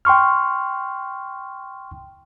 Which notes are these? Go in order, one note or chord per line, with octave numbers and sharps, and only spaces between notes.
G5 C6 C#6 F6